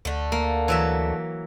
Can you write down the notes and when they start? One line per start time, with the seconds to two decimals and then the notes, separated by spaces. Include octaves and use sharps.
0.05 D2 D3 A3
0.32 A#3
0.68 E3 F#3 E5